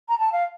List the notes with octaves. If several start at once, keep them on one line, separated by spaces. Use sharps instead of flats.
A#5
A5
F5